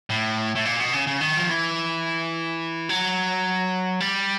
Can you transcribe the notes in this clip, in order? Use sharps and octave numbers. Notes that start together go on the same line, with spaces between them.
A2
A2
A#2
B2
C#3
C#3
D#3
F3
E3
F#3
G3